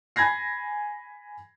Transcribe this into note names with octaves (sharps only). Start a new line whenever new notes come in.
G#5 B5 G#6 A#6 C7